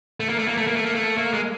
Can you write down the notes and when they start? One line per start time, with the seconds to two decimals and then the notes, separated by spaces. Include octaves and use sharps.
0.20 A3
0.29 A#3
0.39 A3
0.48 A#3
0.57 A3
0.67 A#3
0.76 A3
0.86 A#3
0.95 A3
1.18 A#3
1.33 G#3